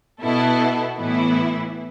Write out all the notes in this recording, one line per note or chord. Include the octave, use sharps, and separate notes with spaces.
B2 B3 E4 A4
A2 E3 B3 E4